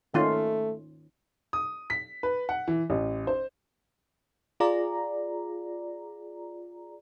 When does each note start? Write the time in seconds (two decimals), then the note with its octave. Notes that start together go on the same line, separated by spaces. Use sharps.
0.14 D#3 A3 C#4 F4
1.53 D#6
1.90 B6
2.23 B4
2.49 F#5
2.68 E3
2.90 A1
3.27 C5
4.60 F4 G#4 D5 A#5